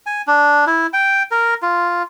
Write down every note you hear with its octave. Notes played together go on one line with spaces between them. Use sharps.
G#5
D4
E4
G5
A#4
F4